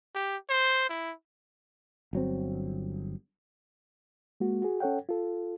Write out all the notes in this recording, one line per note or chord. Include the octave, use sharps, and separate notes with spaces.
G4
C5
E4
G1 F#3 C4
G#3 A#3 F#4
F#4 G#4
C#4 A4 C#5 F#5 G5
F4 A4